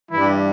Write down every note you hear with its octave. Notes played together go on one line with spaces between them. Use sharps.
G2 E3 G3 E4